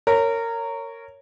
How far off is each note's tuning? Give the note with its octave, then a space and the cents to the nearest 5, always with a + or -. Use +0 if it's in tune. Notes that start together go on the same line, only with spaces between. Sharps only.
A#4 -20 C#5 +0